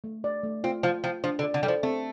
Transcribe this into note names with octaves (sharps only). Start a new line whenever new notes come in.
A3
D5
A3
C4 F4
F3 F4
F3 G5
F3 D4
D3
D5
D3
G3 A4
F3
A3 C4